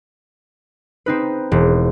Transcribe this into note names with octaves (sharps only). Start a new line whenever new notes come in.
C4 D#4 B4
E1